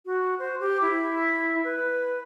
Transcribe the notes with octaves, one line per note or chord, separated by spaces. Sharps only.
F#4
C5
G4
E4
B4